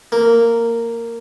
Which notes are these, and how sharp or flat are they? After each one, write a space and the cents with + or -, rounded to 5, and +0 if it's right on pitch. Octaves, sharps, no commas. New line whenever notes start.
A#3 -10